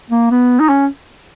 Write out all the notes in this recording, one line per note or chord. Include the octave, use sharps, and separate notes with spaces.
A#3
B3
D#4
C#4